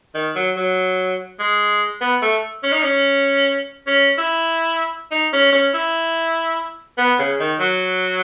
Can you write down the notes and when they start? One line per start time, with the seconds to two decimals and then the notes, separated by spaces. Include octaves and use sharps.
0.14 D#3
0.35 F#3
0.57 F#3
1.39 G#3
2.01 B3
2.22 A3
2.63 C#4
2.72 D#4
2.82 C#4
3.87 C#4
4.18 E4
5.11 D#4
5.33 C#4
5.52 C#4
5.74 E4
6.98 B3
7.19 C#3
7.39 D#3
7.60 F#3